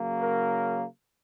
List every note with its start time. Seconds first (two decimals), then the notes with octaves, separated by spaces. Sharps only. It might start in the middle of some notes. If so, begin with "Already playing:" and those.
Already playing: C#3 F#3 A#3
0.22 A#4